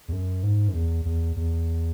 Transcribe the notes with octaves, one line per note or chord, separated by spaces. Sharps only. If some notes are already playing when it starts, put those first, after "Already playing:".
E2
F#2
G#2
F#2
E2
E2
E2